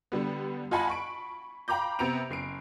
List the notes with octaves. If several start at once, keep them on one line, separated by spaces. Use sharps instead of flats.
D3 G3 B3
F4 D#5 F#5 G#5 A5 B5
B5 C#6 D7
F5 G5 A#5 B5 D6 G6
C3 B3 A#5 D7 F7
F#1 C7 D7